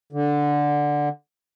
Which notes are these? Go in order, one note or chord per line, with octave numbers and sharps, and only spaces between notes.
D3